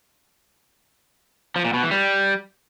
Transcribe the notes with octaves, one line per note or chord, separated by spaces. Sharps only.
F3
A#2
B2
E3
G3